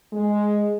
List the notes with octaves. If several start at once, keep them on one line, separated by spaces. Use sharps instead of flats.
G#3